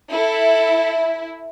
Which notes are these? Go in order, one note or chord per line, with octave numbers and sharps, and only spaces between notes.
E4 A4